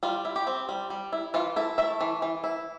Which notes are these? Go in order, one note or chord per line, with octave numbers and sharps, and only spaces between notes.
G3 F4
E4
G4
C4
G3
G3
E4
E3 F4
E4 A4
A3 E5
E3
E3
E4